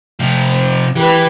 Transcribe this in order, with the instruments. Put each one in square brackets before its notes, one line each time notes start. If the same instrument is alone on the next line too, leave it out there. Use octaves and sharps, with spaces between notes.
[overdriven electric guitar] C3 F3
[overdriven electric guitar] E3 [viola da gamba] G4 B4